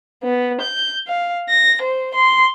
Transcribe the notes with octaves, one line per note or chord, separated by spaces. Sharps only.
B3
G6
F5
A#6
C5
C6